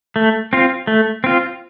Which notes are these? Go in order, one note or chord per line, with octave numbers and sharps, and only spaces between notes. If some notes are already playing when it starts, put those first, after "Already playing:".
A3
C4 F4
A3
C4 F4